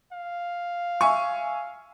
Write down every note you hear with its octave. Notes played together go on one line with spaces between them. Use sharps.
F5
E5 G#5 C#6